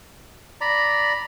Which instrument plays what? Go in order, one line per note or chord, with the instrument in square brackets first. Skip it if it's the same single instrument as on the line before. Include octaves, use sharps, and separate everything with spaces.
[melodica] D5 A#5 B5